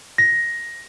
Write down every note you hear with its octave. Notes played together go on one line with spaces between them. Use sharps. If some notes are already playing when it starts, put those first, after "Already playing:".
A#6